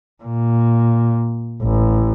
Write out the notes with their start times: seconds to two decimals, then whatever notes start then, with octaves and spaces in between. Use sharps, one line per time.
0.23 A#2
1.62 A1